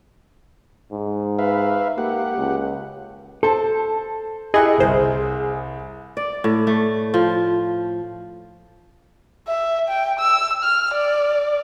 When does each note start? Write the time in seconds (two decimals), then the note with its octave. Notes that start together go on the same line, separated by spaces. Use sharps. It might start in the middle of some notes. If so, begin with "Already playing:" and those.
0.92 G#2
1.39 B4 E5 F5
1.98 A#3 G4 F#5
2.37 C#2
3.43 A4 C5 A5
4.54 E4 G4 G#4 D#5 C#6 F#6
4.78 G1 C2 A#4 C5
6.17 D5
6.44 A2
6.67 A3
7.14 F3
9.48 E5
9.89 G5
10.19 E6
10.63 F6
10.94 D5